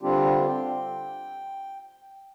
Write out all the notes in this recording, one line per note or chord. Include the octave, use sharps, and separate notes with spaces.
D3 G3 C4 D4 F4 G4
G5